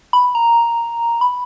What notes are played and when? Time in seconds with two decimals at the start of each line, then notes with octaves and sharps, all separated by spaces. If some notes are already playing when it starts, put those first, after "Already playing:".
0.13 B5
0.35 A#5
1.21 B5